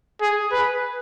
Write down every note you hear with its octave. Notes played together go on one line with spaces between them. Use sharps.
G#4
B4